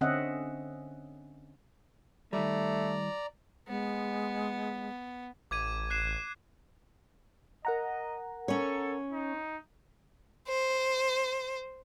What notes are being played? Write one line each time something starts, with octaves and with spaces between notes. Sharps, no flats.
D3 C4 C#4 D#5 E5 F#5
D#3 G3 A3 D5 A#5
G#3 B3
A1 D6 G#6 D#7
F#6 C7 E7
A#4 D#5 F#5 A#5
C#4 A4 C#5
D#4
C5